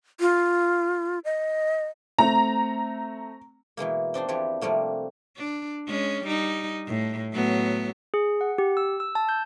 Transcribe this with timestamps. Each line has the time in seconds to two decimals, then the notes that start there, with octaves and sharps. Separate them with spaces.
0.20 F4
1.25 D#5
2.19 A3 C4 A#5
3.77 B2 E3 G#3 A#3
4.14 C4 D4 D#4 C5
4.28 E2 E3 F3 D4 G4
4.61 C3 F3 G3 A3 A#3
5.37 D4
5.87 G#3 C#4
6.24 G3 D#4
6.87 A2
7.33 A2 F#3 B3
8.14 G#4
8.41 F#5
8.58 G4
8.77 E6
9.00 E6
9.15 A5
9.29 G6